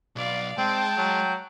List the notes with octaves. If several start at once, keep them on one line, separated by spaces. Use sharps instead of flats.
B1 D5 F5
G#3 C4 G5 A5
F#3